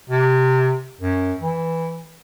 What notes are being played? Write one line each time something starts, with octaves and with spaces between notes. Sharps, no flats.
C3
F#2
E3